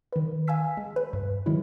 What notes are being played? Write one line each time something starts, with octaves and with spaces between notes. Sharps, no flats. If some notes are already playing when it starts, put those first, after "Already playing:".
D#3 B4
F5 G#5 A5 E6 B6
G#3
B4
G2
D#3 F#3 G#3 E4